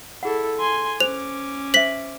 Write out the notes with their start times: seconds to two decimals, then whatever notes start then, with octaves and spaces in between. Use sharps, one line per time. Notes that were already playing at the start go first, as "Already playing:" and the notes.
0.23 E4 G#4 A4 F#5
0.59 G#5 C6
1.00 C#4 C5 D6 F7
1.74 C5 E5 B6 F#7